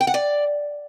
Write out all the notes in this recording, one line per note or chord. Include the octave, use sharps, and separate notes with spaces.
G5
F#5
D5